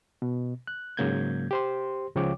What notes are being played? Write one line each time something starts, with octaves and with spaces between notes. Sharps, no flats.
B2
F#6
G#2 C#3 F#3 A#3 G6 G#6
G4 C5 C6
C#2 C#3 F3 C#5 G5 D6